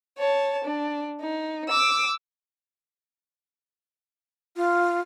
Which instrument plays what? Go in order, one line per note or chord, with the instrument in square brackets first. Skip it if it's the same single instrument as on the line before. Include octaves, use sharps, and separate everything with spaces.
[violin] C#5 A5
D4
D#4
D6 E6
[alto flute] F4